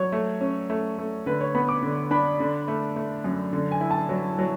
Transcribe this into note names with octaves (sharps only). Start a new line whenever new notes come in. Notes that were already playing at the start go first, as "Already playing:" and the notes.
Already playing: F#3 C#5
A3
C#4
A3
A3
D3 B4
C#5
B3 B5
D6
D3
D4 B5
D3
A3
A3
F#2
D3
G#5
E4
A5
F#3
F#3